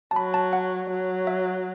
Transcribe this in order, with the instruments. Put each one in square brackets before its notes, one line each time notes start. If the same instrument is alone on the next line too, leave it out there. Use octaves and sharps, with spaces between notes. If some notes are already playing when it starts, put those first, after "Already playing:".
[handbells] A5
[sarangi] F#3 [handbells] B5
[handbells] A5
F#5
[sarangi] F#3
[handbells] E5